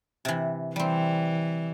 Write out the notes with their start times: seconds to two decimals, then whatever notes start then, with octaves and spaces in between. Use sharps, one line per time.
0.25 C3 E3
0.76 E3 G3 C4